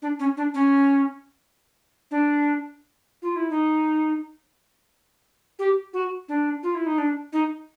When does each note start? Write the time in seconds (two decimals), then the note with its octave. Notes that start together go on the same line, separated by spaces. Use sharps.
0.02 D4
0.19 C#4
0.37 D4
0.54 C#4
2.11 D4
3.22 F4
3.36 E4
3.50 D#4
5.59 G4
5.93 F#4
6.28 D4
6.63 F4
6.75 E4
6.86 D#4
6.98 D4
7.32 D#4